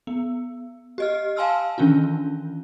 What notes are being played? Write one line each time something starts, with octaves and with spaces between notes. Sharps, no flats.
B3
G4 D#5 F6
F5 G#5 A5 C6 E6 F6
D#3 E3 C#4 D4 F4